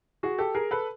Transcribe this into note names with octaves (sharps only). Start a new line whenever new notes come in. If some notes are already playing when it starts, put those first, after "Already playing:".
F#4 G#4
G4 A4
G#4 A#4
A4 B4